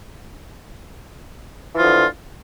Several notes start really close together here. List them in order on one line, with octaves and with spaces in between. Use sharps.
E3 F4 F3 D3